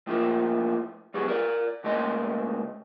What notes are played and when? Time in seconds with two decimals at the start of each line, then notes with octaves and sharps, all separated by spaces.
0.07 A2 F3 A#3
1.14 F#3 G3 B3 F#4 G#4
1.28 A#4 D5
1.84 C#2 A3 A#3 D#5 C6